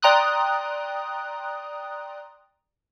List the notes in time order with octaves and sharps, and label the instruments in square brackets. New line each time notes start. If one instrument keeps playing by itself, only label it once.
[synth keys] D5 G5 A#5 C6 D#6 F#6